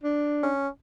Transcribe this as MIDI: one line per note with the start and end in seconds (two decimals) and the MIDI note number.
0.03 0.50 62
0.43 0.68 61